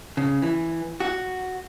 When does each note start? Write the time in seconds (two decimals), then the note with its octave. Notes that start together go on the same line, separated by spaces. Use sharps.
0.17 C#3
0.42 E3
1.00 F#4